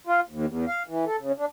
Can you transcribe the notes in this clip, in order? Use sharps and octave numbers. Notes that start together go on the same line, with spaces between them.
F4
D#2
E2
F5
E3
A4
C#3
D4